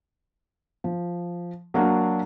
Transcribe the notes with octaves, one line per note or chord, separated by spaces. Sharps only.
F3
F#3 A#3 D4 F#4